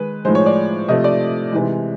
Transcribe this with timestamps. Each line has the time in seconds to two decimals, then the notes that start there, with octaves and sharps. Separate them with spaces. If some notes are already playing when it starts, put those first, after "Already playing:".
Already playing: D#3 G#3 B4
0.25 A2 F3 G#3 C5
0.35 C#5
0.46 D5
0.88 C3 F3 A3 D#5
1.04 D5
1.52 C3 E3 G#3